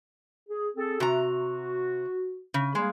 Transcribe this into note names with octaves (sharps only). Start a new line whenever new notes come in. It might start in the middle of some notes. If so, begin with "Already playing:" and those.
G#4
C4 G#4 A4
C3 F#4 A#5
C#3
G3 G#3 A#3 G#4